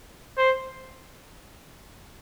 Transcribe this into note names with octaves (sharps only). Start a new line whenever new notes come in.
C5